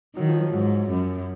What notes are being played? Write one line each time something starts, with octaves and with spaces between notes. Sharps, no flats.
D#3 F#3
F3
F#3
F3
G#2 F#3
F#2